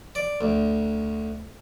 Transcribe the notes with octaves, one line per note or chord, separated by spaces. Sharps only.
D5
D2